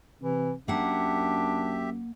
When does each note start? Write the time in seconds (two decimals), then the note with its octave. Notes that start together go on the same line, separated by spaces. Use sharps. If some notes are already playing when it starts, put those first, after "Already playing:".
0.22 C3 E3
0.68 F#2 A#3 D4 G4 E5 F#5